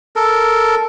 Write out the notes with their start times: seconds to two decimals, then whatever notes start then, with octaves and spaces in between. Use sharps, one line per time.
0.16 A4 A#4